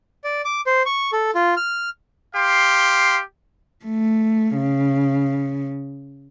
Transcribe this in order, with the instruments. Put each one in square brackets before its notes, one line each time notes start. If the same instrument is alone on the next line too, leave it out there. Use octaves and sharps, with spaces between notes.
[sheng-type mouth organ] D5
D6
C5
C#6
A4
F4
F6
[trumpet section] G4 F5 C6
[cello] A3
C#3